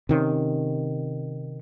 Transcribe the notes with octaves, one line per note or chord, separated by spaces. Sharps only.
C3 D#3 C#4